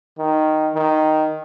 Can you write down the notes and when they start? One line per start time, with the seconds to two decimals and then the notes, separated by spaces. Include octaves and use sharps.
0.19 D#3
0.75 D#3